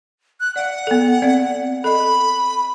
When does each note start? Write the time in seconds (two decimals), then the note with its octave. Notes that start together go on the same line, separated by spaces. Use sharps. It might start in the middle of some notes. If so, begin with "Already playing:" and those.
0.40 F#6
0.56 D5 F5 F#5
0.87 B3 A4
1.22 C4 D5 F5
1.84 A4 D#5 B5